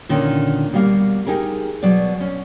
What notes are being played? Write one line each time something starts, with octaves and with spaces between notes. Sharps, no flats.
A#2 D3 D#3 C#4
B2 G3 A#3 F5
D#4 G4 G#4 A#4
B2 F#3 B3 D5
C#4